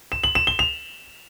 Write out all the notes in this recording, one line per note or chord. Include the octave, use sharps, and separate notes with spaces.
E7
F#7
E7
G7
F7